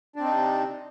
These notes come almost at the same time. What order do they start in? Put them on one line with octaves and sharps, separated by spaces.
D4 C4 D#4 C3